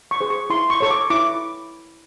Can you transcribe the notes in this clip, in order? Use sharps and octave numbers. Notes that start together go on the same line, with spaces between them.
C#6
G#4 C5
C#6
E4 C6
C#6
A4 C#5 C#6
D6
E4 D6